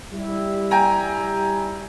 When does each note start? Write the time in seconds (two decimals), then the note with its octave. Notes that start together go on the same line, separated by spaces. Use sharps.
0.13 G3 E4
0.71 G5 G#5 A#5